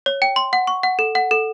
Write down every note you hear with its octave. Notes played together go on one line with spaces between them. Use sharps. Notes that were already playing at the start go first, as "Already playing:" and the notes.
C#5
G5
C6
F#5
C#6
F#5
A4
F#5
A4